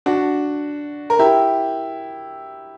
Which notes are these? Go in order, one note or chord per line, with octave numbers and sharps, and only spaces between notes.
D4 F#4
A#4
E4 G4